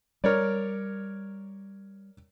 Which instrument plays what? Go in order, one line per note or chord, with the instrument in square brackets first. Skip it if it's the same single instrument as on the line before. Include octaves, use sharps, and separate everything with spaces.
[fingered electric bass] G3 [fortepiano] A#4 C#5 D5